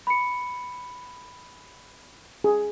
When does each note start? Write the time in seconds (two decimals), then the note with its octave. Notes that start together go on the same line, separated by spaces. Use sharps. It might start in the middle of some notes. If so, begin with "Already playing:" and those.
0.07 B5 C#7
2.44 G#4